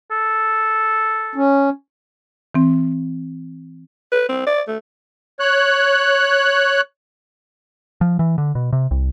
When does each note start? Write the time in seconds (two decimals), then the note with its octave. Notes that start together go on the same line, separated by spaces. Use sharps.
0.11 A4
1.35 C#4
2.55 E3 C4
4.12 B4
4.29 C4
4.47 D5
4.68 A3
5.40 C#5 F#6
8.01 F3
8.19 E3
8.38 D3
8.55 B2
8.73 C3
8.91 C2